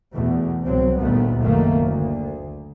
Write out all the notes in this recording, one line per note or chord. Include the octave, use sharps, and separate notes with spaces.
E2 B2 A3
C2 G#2 F#3 C4
G1 D2 A#2 D#3 A3 B3
F#1 B1 B2 D#3 A3 A#3
D2